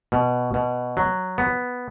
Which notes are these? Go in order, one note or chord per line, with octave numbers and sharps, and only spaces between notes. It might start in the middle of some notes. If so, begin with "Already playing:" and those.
B2
B2
F#3
B3